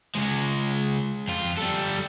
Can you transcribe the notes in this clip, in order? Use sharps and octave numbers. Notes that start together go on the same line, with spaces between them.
C#3 G#3
F2 F4
G3 A4